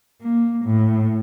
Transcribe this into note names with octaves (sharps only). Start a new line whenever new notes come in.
A#3
A2